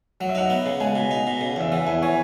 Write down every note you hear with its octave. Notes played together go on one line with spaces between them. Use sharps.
F#3 F#5
E5
D#4 F#5
B3
C#3
G#3 G#5
B2
D#4
B2
C#3
E2 E5
E3 F#5
E2 G#5
E3 C#5